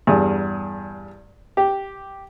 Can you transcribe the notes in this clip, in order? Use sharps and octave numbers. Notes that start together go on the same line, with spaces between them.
E2 G2 G#4
G4